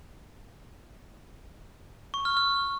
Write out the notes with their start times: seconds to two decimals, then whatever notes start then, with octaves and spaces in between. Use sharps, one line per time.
2.14 C#6
2.25 F6
2.37 F6